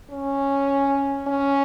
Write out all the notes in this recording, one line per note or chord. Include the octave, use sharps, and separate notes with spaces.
C#4
C#4